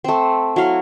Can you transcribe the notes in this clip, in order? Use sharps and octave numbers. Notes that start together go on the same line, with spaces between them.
A3 C4
F#3 E4 F5